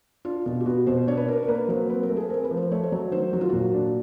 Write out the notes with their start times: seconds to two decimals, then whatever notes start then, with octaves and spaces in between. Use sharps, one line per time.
0.25 D4 F4
0.45 B2 F4
0.60 G4
0.66 B3 F#4
0.87 B2 C5
1.07 D4 C#5
1.17 B4
1.28 D4 A#4
1.43 A#4
1.48 A#3 B4
1.68 F#3 C5
1.89 C4 B4
2.03 A#4
2.10 A3
2.17 G#4
2.30 C4 A#4
2.44 B4
2.51 F3
2.57 C5
2.71 A3 C#5
2.84 C5
2.92 F#3 C#5
3.12 D#3 C5
3.33 F#3 F#4
3.41 F4
3.49 A#2 F#4
3.74 D4